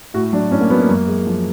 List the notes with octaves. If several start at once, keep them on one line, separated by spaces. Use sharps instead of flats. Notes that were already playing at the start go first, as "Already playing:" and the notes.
A2 F#4
F#3 D4
A2 C#4
A#3
F#3 B3
A#3
F#2
G#3
F3